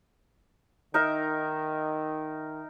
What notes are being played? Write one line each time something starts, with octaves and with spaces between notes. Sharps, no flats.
D#3 D#4 A#4 E5